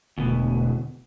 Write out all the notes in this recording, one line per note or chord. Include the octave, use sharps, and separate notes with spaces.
E1 D2 B2